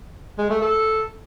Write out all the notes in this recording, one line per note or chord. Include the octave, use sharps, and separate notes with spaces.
G#3
A3
A4